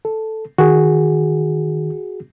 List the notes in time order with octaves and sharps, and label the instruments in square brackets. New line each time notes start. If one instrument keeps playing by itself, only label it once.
[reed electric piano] A4
[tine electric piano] D#3 [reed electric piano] F#4 G#4